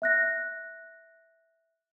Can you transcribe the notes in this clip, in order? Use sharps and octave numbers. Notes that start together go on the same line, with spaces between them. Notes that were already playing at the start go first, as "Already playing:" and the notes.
E5 F#6 A#6